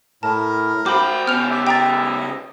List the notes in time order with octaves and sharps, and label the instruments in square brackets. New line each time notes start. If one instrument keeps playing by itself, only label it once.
[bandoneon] A2 [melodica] A#4 [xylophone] A5
[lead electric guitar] F#4 C5 [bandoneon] G5 [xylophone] B5 D6
[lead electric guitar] C#3 B3 [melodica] C#4 [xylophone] F6 F7
[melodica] G4 [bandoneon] E5
[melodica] D#5 [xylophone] G5 A#5 A6